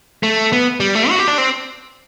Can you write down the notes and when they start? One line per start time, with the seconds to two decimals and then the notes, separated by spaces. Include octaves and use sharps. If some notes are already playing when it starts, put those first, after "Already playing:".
0.23 A3
0.53 B3
0.80 G3
0.95 A3
1.10 F#4
1.19 G4
1.28 D4
1.38 C4